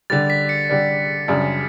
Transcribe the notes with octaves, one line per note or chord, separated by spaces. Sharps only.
D3 G3 D4 A6
B6
C#7
D3 G3 D4
F#2 C#3 G3 D4